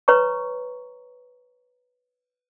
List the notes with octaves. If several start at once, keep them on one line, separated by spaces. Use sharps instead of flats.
B4 C#5 A#5 C#6